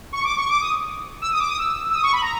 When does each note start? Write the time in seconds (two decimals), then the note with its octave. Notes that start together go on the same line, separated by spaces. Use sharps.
0.12 C#6
0.24 D6
0.37 C#6
0.49 D6
0.61 D#6
1.21 E6
1.31 D#6
1.39 D6
1.49 D#6
1.58 E6
1.90 E6
1.94 D#6
2.03 C#6
2.13 B5
2.22 A#5